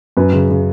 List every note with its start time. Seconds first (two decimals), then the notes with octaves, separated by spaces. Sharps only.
0.17 F#2 B4
0.33 C#3
0.50 C#3